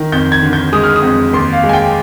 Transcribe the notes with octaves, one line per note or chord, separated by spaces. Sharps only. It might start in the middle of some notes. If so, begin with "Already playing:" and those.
Already playing: D#3
F2 G6
G#6
D3
G6
G#3 D#6
F6
D#6
F2
D#2 C6
F5
G#3
G#5
G5